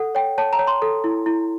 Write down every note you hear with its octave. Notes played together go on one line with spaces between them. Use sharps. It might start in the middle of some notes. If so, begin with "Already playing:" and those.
Already playing: A4 F#5
C#5 G5
C#5 A5
A#5
C#5
C6
A4
E4
E4